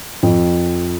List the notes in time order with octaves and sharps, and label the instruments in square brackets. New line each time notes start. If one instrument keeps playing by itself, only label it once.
[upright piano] F2